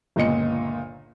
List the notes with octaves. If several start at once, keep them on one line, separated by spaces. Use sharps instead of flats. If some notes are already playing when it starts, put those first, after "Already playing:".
G1 C#2 A#2 D#5 C#7